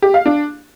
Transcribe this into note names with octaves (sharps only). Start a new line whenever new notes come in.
G4
F5
D4